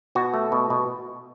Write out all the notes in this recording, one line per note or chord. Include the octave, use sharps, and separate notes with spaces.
B2 F#4
A3
B2
B2